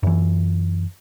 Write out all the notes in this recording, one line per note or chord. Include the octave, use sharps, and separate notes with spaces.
F#2 E3